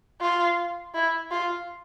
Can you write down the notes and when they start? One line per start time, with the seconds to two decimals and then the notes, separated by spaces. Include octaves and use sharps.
0.21 F4
0.94 E4
1.31 F4